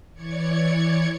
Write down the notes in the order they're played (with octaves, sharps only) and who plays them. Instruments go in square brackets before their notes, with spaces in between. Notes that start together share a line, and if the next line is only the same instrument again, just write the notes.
[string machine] E3 C#5 D5 G#6 C#7